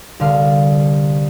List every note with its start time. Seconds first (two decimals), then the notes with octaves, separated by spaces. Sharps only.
0.20 C2 D3 F5